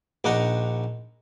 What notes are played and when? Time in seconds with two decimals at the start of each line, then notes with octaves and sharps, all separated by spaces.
0.24 A#1 D4 D#4 F#5 A#5